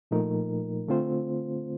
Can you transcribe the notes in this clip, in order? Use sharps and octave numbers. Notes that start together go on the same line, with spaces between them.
A#2 F3 A3 D#4 A#4
D3 A3 C4 F4 C5